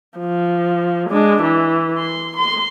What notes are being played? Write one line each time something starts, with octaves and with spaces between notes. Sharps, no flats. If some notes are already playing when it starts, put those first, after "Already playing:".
F3
G#3 D4
E3
C6
C6